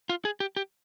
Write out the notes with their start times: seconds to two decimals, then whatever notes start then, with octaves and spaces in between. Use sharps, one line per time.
0.09 F4
0.25 G#4
0.40 G4
0.56 G4